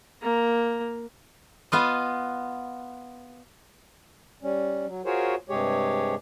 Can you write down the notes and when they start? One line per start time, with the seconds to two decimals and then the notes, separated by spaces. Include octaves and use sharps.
0.22 A#3 A#5
1.72 B3 F4 D#5
4.43 G3 C#4
4.87 F#3
5.05 F4 F#4 G#4 A#4 C5 C#5
5.49 G2 C3 G#3 G4 G#4 C#5